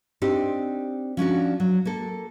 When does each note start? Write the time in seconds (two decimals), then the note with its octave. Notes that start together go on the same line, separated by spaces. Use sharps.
0.22 C4 D4 D#4 G4
1.17 F3 C#4 D4 F#4
1.60 F#3
1.85 A#3 A4